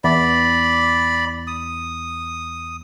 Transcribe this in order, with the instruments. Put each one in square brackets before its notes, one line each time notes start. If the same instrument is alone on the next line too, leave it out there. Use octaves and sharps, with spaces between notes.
[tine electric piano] E2 [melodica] D5 B5
[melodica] D#6